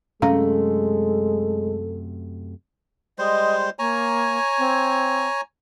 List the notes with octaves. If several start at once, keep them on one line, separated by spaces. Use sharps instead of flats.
F#2 C3 G#3 A3 C#4 A4 F5
G3 G#3 C5 D#5
A#3 C#5 G#5 A#5
C4